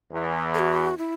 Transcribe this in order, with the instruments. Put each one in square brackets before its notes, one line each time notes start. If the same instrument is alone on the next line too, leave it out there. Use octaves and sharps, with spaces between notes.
[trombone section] E2 E3
[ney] A4
F#4
E4